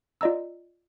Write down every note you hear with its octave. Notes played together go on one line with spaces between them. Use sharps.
F4 D5 D#5 A#5 E6